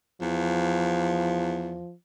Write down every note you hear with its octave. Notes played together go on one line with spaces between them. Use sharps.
E2 F3